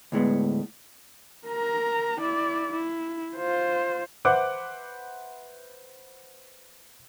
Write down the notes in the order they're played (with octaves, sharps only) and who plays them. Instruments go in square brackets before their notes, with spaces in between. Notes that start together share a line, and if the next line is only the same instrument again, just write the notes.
[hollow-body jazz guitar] D2 A2 G#3 B3
[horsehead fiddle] A#4 A#5
E4 D5
E4
F4 C5
[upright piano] B4 C5 E5 F#5 D6 F#6